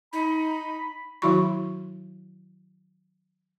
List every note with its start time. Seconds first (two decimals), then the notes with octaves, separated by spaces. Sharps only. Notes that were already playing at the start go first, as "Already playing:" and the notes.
0.13 D#4 B5
1.22 D#3 F#3 E4 F#4 B5 C#6